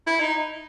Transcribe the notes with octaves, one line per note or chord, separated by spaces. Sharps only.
E4
D#4